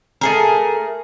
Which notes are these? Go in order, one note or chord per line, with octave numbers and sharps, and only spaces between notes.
A3 G#4 A#4